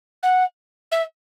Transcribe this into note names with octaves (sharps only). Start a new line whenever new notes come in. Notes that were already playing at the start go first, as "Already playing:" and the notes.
F#5
E5